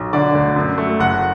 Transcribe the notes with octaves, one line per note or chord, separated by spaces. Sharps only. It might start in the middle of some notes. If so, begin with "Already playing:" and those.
Already playing: B1
D3 D5
D2
F#2
A3
F#1 F#5